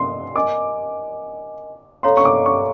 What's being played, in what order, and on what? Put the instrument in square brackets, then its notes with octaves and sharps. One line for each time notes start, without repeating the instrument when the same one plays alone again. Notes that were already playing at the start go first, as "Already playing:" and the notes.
Already playing: [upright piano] C6
[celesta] A#4 D#5 G#5 [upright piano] D6
[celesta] A4 C#5 F5 A#5 [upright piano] C6
[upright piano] C#6
D6
C#6